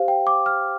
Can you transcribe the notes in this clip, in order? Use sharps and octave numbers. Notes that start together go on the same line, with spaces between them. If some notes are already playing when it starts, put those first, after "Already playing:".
Already playing: G4 C5 F5
G5
D6
F6